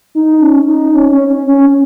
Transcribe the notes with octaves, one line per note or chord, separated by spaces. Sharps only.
D#4
C#4
D#4
C#4
C#4
C#4
C#4